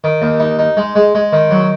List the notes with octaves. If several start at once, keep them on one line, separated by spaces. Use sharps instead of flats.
D#3
D#2
D#4
D#4
G#3
G#3
G#3
D#3
F#3